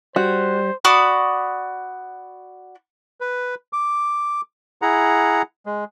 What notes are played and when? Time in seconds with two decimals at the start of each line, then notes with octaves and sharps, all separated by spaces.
0.16 G3 F#4 C5
0.85 F#4 D5 B5 D#6
3.21 B4
3.73 D6
4.82 E4 G#4 F#5 A#5
5.66 G#3